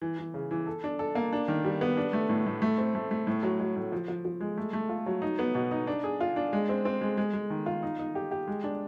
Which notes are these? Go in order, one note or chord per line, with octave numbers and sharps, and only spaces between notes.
E3
E3
C#3
E3
A4
D4
A4
A#3
D4
D#3
G3
B3
D4
A3
A2
A2
A3
C4
A3
A3
A2
F#3
F#3
A2
F3
F3
F3
G#3
A3
A3
F4
F#3
D#4
B3
B2
D#4
D4
G#4
F4
D4
G#3
C4
C4
G#3
G#3
G#3
D#3
F4
D#4
D#4
G4
G4
G#3
D4